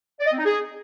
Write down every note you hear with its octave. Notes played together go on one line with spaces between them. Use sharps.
D5
D#5
C4
D#4
G#4